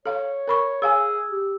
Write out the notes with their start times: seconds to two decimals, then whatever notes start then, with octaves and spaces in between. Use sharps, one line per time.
0.06 A4 C#5 F5
0.48 A#4 B5 C#6
0.82 G#4 C#5 F5 G#5 E6
1.31 G4